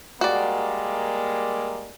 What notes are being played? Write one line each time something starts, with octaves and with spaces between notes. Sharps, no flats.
G3 G#3 A#3 F#4 D5